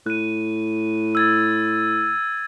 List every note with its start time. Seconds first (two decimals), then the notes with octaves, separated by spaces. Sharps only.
0.06 A2 F#6 D#7
1.15 E6 G#6 A6